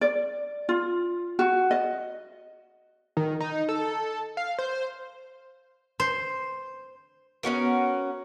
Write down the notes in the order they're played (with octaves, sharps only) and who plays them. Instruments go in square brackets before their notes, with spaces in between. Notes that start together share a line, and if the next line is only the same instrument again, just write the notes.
[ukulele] D5
F4
F#4
D#5
[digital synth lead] D#3
D#4
A4
F5
C5
[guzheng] C5
[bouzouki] B3 C#4 F#4 A#4